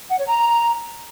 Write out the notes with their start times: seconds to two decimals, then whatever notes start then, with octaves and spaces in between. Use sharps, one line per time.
0.09 F#5
0.17 C#5
0.25 A#5